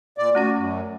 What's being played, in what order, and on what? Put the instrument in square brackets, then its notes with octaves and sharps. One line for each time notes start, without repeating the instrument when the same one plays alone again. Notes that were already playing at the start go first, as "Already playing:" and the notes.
[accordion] A#2 D5
[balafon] A3 C#4 F#5 [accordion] F#4
[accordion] F#2